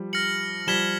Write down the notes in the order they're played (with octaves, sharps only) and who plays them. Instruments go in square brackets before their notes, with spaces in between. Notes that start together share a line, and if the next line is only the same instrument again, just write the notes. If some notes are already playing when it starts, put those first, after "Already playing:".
Already playing: [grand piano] F3 G3
[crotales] F6 A#6 C#7 F#7
[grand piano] F3 G3 [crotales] G#6 B6 E7 G7